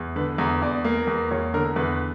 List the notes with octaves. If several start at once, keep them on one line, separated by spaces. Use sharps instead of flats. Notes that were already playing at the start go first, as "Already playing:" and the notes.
Already playing: E2
D3 B4
E2 A#5
E2 D5
A#3
E2
E2 C#5
D3 A#4
E2 B4